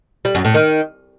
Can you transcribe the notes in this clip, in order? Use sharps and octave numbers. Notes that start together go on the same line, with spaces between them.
G3
F#2
A2
D#3